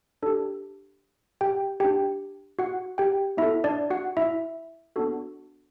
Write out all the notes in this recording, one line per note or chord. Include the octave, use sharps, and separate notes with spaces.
D4 G4 A4
G4 G5
D4 G4 G5
F#4 F#5
G4 G5
B3 E4 F#4 A4 E5
D4 D5
F#4 F#5
E4 E5
B3 D4 F#4 A4